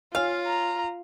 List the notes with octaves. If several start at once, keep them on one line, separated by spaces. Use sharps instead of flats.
F4 C#5 F5 G#5
A#5